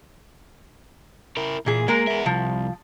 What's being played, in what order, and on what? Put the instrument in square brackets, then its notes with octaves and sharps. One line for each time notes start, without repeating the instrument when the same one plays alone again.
[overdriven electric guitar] E4 A#4
[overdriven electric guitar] A#2 [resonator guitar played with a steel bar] E3 G#4
[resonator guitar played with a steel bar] G#3 A#4 [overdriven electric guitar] A#3
[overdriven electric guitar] B3 E5
[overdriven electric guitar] C2 [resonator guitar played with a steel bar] F3